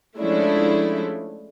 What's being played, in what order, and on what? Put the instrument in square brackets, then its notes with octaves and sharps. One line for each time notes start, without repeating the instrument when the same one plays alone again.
[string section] F3 G#3 A3 C#4 D4 E4